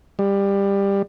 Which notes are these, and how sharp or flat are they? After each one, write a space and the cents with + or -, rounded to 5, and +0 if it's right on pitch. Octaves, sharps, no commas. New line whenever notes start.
G3 +20